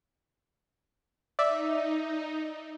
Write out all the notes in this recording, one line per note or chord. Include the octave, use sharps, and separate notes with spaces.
D#4 D5 E5